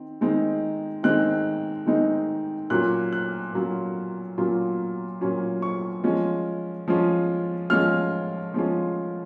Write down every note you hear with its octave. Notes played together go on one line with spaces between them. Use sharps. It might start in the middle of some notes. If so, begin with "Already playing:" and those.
Already playing: D#3 C4
D#3 G#3 C4 D#4
D#3 G#3 C4 D#4 F#6
D#3 G#3 C4 D#4
A#2 F#3 C#4 F4 F#6
F#6
A#2 F#3 C#4 F4
A#2 F#3 C#4 F4
A#2 F#3 C#4 F4
C#6
F3 G#3 C#4 F4
F3 G#3 C#4 F4
F3 G#3 C#4 F4 F6
F3 G#3 C#4 F4